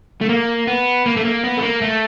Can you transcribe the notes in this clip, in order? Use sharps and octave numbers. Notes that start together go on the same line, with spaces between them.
A3
A#3
B3
A#3
A3
A#3
B3
A3
A#3
A3